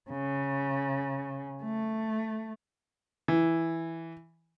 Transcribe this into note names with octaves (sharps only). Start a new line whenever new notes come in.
C#3
A3
E3